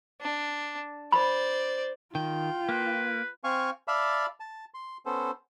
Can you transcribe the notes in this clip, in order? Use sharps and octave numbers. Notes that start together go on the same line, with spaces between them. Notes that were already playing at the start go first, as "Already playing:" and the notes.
D4
C5 D5 B5
D#3 F4 G5
A#3 B4
C4 F5 G#5 C#6
D5 E5 F5 A5 B5
A5
C6
B3 C#4 A4 C5